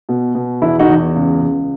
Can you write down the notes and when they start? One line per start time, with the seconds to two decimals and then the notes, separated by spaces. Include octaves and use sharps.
0.09 B2
0.35 B2
0.62 E2 E4
0.79 D#4 F#4
0.89 E2
1.16 C#2
1.42 C#2